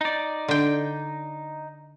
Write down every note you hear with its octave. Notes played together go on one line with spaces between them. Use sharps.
D#4 D5
D3 G5